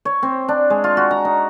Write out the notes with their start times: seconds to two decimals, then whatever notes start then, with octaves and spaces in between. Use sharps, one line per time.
0.05 C#5
0.23 C4
0.48 D4
0.70 G#3
0.84 F4
0.97 F#4
1.11 A#5
1.25 D#4